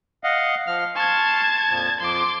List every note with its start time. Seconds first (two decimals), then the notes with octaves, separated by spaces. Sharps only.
0.24 D#5 F5 F#5
0.67 F3 F5 F6
0.96 A5 C6 C#6 F6 G#6
1.70 F2 A#2 F3
2.00 F2 F3 C6 D6